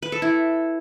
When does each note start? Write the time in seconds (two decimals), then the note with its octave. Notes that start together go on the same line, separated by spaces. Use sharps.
0.02 B4
0.12 A4
0.22 E4